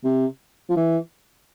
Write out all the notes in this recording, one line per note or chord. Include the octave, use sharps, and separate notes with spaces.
C3
F3
E3